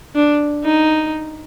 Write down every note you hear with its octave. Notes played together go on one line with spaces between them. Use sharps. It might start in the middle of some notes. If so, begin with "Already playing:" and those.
D4
D#4